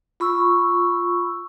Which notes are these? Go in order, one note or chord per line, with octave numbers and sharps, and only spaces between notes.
F4 B5 C#6 E6